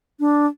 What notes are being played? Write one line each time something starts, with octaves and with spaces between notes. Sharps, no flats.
D4